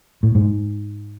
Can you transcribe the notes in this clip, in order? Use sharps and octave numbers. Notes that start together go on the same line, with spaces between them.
A2
G#2